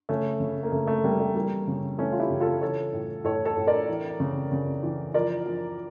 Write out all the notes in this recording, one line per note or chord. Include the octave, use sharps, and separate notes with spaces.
C#3 A3 C#4
C#3
A#3
C#3 A3
A3
C#3 G3 A#3
G3 A#3
E3 G3 A#3
C#3
E3 A3 C#4
F4
E4 G4
C#3
F4 A4
E3 A4 C#5
A2
A2 A4 C#5
A4 C#5
A2
A#4 D5
E3
C#3
C#3
E3
F3 A#4 D5
F3